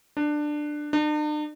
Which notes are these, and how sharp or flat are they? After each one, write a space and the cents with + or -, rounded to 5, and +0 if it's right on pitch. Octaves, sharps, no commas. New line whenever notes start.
D4 +15
D4 +45